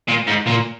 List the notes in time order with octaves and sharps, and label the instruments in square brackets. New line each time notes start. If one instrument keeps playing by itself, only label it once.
[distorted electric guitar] A#2
G#2
A#2